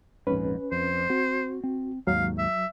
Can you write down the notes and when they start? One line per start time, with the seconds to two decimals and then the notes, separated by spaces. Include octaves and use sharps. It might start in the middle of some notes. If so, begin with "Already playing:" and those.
0.27 A#1 F2 G#2 C#4 B4
0.72 F2 C5
1.10 C4 F#4
1.64 C4
2.07 D#2 G#2 F#3 F5
2.38 E5